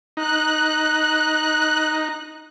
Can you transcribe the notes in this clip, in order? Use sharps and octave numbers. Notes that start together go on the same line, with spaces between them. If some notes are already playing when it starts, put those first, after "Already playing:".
D#4 F#6